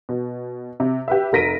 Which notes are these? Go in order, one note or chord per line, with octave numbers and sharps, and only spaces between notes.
B2
C3
G4 B4 E5
F1 A#4 A#6 B6 D7 D#7